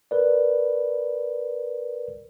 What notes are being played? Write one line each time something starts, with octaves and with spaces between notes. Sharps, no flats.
A#4 B4 D5